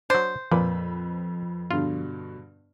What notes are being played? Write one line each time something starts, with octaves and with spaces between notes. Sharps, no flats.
F#3 D4 C5
F2 A#2 F3 B4 B5
G2 B2 D3 F4